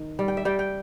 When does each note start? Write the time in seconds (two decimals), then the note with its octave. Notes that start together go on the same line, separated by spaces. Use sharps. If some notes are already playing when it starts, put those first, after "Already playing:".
Already playing: D#3
0.19 G3
0.28 G5
0.37 E5
0.45 G3 G5
0.59 G5